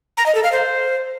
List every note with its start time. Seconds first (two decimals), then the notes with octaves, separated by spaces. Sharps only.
0.17 A#5
0.26 D#5
0.35 A4
0.43 F5
0.52 C5